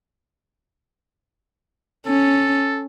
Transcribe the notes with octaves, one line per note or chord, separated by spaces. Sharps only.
C#4 A4